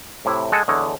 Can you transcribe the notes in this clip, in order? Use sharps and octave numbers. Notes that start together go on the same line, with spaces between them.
A2 C3 E4
G#3 A4 F#5 G#5 A5
E2 D3 C#5 D#5 F#5